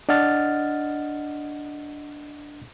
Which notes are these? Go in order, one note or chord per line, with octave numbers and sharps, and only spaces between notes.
D4 D#5 F#5 F6 A6